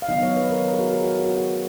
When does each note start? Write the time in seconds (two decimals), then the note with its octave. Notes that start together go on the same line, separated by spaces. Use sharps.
0.02 F5
0.09 D#3 F#3 B3 D#4 D#5
0.23 C#5
0.36 B4
0.51 A#4
0.64 A#4
0.73 G#4
0.79 F#4
0.93 G#4
1.04 F#4
1.15 F#4
1.26 F#4
1.37 F#4